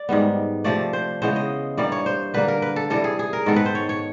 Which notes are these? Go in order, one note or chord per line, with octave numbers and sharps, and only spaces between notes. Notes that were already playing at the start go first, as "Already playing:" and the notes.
Already playing: D5
G#2 D#3 G3 B3
C3 F3 A3 D5
C5
C#3 E3 G#3 B3 C5
D#5
G2 E3 G3 A#3 D5
C#5
C5
D3 G3 A#3 B4
A#4
B4
A4
C3 E3 G3 A4
G#4
G#4
A#4
G#2 D#3 G#3 B3 A4
B4
C5
C#5
C#5